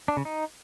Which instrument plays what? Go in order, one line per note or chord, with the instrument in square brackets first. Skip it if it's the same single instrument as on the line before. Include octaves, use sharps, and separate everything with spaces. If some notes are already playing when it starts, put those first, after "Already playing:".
[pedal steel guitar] D4
C#3
D#4